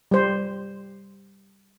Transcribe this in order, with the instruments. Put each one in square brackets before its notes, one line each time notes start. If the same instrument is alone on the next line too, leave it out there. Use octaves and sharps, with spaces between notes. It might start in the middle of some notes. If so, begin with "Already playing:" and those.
[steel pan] G3 C5